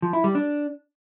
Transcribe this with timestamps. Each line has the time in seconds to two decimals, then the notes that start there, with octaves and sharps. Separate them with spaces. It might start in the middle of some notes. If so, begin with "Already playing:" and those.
0.02 F3
0.13 E4
0.24 G3
0.35 D4